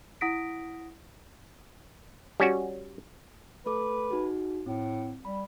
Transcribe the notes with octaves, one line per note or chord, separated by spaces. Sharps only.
E4 F#5 D#6 A#6 B6 D7
G3 C#4 F#4
A3 A4 B4 D6
D#4 F#4 G#4
A2 C4
G3 B5